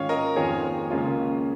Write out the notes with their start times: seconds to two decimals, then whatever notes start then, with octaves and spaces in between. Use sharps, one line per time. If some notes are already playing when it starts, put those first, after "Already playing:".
Already playing: G#2 D#3 C#4 F4 C#5 F5
0.09 A#4 D#5
0.36 F2 D#3 A#3 F4 G#4 C#5
0.91 C#2 C#3 A#3 C#4 F4